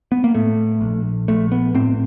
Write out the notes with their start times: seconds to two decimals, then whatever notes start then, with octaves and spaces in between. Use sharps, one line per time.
0.12 B3
0.24 A#3
0.34 A2 A3
0.81 A#1
1.28 A#1 A3
1.52 B3
1.74 A2 C4